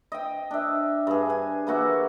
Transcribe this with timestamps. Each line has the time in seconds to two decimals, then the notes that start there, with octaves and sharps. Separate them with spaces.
0.12 D#5 G5
0.51 D4 E5
1.07 G2 G#4
1.30 G#5
1.67 E3 A#3 F#4 E5